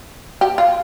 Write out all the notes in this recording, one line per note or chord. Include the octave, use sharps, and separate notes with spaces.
G4
F4